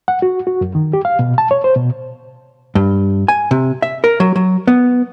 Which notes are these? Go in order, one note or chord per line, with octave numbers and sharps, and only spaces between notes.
F#5
F#4
F#4
F#2
D#3
G4
F5
B2
A5
C#5
C5
B2
G2
G#5
C3
E5
A#4
F#3
F#3
B3